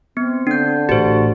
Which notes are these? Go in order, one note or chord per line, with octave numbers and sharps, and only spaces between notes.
B3 C4
D3 D4 G6
A1 F#4 G4 C5